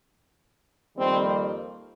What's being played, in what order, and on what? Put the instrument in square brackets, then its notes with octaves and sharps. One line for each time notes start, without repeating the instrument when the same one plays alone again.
[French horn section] F2 D#3 G3 A#3 C4